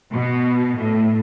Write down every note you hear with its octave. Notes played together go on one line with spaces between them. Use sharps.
B2
A2